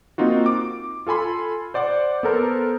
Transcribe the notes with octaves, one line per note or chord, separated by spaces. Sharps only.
A#3 C4 D#4 F4 F#4
D6
F4 A4 G#5 B5 C6
C5 D5 F#5 D6
B3 A4 A#4 C5